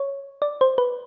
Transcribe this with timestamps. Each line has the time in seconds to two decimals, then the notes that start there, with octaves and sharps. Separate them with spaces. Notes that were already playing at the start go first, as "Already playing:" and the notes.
Already playing: C#5
0.42 D5
0.61 C5
0.78 B4